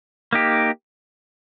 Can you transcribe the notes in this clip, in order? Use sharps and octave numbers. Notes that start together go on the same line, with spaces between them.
A#3 D#4 G4